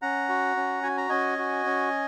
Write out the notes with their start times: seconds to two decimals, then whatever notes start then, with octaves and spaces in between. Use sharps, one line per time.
0.02 C#4 F#5 A#5
0.29 F#4
0.57 C#4
0.83 F#4 G#5
0.97 A#5
1.09 C#4 D#5 G#5
1.38 F#4
1.66 C#4